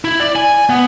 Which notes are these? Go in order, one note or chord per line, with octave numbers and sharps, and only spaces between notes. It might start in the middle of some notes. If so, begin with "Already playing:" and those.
E4
D5
G#5
B3